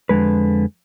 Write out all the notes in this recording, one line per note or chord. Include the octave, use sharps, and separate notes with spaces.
F2 D3 G#3 B4